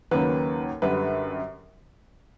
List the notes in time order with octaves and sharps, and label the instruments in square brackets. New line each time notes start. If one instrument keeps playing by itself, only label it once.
[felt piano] D#2 C#3 F#3 A#3 C#4 [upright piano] B4
[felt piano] F#2 D3 G3 [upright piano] B4